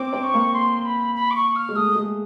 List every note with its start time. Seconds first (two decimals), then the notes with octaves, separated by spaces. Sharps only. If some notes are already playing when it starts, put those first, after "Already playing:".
Already playing: C4 D6
0.13 C4
0.24 C#6
0.34 A#3
0.53 C6
0.85 B5
1.15 B5
1.31 D6
1.36 C#6
1.56 F6
1.69 G#3
1.76 A3 D#6
1.96 G#3